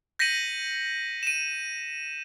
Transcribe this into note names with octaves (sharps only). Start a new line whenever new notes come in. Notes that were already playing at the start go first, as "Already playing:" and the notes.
G6 A#6 B6 C#7 D#7 F#7
D#7 E7